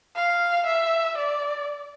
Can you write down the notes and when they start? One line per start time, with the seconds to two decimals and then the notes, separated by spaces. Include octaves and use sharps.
0.16 F5
0.66 E5
1.18 D5